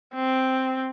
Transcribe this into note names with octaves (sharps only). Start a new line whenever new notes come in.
C4